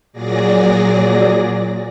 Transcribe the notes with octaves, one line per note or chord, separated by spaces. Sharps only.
A#2 F#3 G#4 D5 A#6